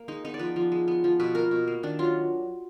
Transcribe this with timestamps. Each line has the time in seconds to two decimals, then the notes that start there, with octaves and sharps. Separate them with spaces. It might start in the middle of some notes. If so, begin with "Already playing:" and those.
Already playing: A#3
0.08 G#3 D#4
0.24 B3 D#4
0.34 D5
0.39 F3 B4
0.56 F3
0.72 G#3
0.88 B3
1.04 F3
1.20 B2 B4
1.35 A#3 A#4
1.51 B2
1.67 A#3
1.83 D#3 D4
1.99 F#3 F4